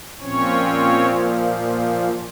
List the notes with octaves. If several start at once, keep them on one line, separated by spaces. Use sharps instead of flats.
A#2 F3 C4 C#4 C#5